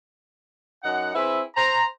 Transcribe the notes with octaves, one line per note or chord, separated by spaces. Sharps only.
F#2 D#4 F#5
C4 E4 G#4 B4 E5
C5 A#5